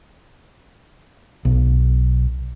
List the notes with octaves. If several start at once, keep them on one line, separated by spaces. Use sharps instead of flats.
B1